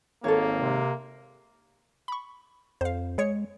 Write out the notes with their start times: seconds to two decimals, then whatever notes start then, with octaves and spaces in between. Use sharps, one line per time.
0.24 G#1 A#3 A4 C#5
0.57 C3
2.08 B5 C#6
2.81 F2 C5 F5
3.18 G#3 G#4 C#5 C#7